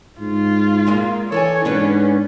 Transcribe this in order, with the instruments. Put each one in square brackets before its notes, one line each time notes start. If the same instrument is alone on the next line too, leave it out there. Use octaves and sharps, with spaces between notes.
[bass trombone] G#2 [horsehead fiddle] F4
[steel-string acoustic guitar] A#2 G#3 A#3
[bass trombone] E3 [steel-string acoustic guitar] A4 D5 G#5 [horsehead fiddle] C#5
[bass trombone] G#2 [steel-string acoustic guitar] B3 D4 B4 [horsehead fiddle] C#4